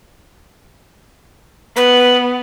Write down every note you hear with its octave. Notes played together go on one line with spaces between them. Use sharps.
B3 B4